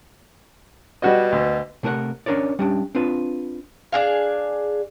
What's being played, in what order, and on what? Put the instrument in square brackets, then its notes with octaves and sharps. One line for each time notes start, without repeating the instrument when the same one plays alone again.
[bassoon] B2 [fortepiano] G3 F#4 D#5
[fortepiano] D2
[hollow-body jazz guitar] C3 A3 A#4 B4 F#5
C#4 D4 A#4 C#5 D5
G3 C#4 D4
C4 D4 F4 B4
[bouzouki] D4 G#4 F5